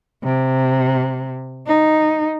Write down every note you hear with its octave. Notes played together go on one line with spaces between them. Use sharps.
C3
D#4